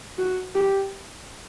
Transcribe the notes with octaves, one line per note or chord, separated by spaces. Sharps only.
F#4
G4